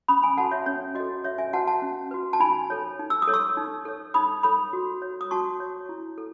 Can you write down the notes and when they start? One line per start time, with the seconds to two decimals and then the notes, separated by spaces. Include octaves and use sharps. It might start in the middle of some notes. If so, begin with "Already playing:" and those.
0.08 C#4 B5 D#6
0.22 G#5 B5
0.37 F#4 A4 F#5 A5
0.51 C#5 E5
0.66 C#4 C#5
0.95 F#4 A4 D#5
1.24 C#4 C#5 E5
1.38 E5 G#5
1.53 F#4 B4 F#5 A5
1.67 F#5 A5
1.82 C#4
2.11 F#4 B4
2.33 A5
2.40 D#4 G#5 B5
2.70 A4 C#5
2.99 D#4
3.10 E6
3.22 D#6
3.27 A4 C#5
3.33 C#6 E6
3.57 D#4
3.85 A4 C#5
4.14 D#4 B5 D#6
4.43 A4 C#5 B5 D#6
4.73 F#4
5.02 C#5
5.21 D#6
5.31 F#4 A5 C#6
5.60 C#5
5.89 E4
6.18 A4